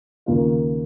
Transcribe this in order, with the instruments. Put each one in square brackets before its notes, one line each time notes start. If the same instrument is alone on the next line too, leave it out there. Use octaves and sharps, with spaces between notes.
[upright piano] D#2 C#3 A#3 F4